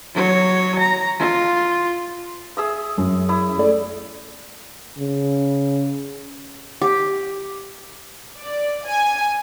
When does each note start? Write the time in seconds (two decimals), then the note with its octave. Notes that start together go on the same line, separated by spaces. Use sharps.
0.14 F#3 C#5
0.79 A#5
1.19 F4
2.57 G#4 E5 D#6
2.97 F#2
3.29 E4 D#6
3.58 A3 D5
4.99 C#3
6.81 G4
8.40 D5
8.85 G#5